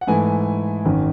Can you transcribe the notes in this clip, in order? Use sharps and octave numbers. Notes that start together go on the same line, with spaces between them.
F#5
G#2 E3 A3 G#5
G#1 F#2 D#3